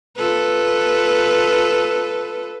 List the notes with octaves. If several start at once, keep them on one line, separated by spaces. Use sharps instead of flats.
F4 A4 B4